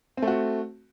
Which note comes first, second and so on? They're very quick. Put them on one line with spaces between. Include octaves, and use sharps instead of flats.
C4 A3 F#4